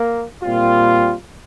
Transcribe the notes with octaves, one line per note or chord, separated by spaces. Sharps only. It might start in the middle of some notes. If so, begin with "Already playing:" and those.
Already playing: A#3
A#2 G3 C4 F4